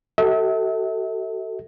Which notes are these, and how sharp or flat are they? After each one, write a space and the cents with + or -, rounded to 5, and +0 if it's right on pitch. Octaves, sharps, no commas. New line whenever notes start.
F#4 +45 A4 +25 E5 -40